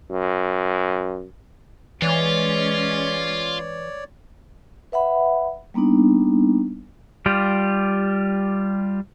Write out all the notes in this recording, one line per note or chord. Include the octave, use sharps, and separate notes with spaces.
F#2
E3 G#3 C#4 F4 C#5 D5
B4 E5 F#5 B5
G3 A#3 B3 D4 D#4
G3 F4 G4